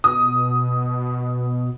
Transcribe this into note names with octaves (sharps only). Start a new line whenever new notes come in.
B2 D#6